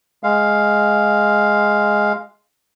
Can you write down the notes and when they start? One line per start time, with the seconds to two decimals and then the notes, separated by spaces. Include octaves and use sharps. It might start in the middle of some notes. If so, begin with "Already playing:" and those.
0.23 G#3 F5